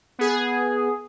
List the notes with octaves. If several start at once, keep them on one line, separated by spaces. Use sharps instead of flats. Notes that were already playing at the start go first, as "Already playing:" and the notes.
B3 G#4